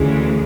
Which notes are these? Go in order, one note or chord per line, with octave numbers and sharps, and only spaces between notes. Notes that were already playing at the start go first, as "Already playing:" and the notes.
Already playing: D2 C#3 E3 G#3